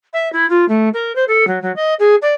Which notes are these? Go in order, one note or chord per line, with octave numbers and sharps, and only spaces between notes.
E5
E4
F4
A3
A#4
C5
A4
F#3
F#3
D#5
G#4
D5